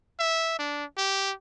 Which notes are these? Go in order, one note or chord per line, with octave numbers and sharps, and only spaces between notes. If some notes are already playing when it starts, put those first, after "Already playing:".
E5
D4
G4